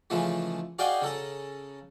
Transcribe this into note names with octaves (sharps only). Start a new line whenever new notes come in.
C#3 E3 F3 G#3 A3
F#4 G#4 D5 D#5 F5 G5
C#3 A4 A#5